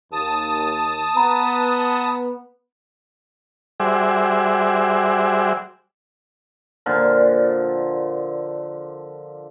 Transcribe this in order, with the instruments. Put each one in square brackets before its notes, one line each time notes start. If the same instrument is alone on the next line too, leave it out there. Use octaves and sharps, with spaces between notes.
[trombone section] D#2 [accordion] A5 D#6
[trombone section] B3 [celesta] A#5 B5
[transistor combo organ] G3 F#4 G#4 C5 D5 E5
[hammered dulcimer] A#2 D3 F3